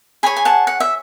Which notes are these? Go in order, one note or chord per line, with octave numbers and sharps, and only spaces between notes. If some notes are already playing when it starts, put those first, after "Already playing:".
G#4 C#5 G#5 B5
G#5
F#5 A5
F#5
E5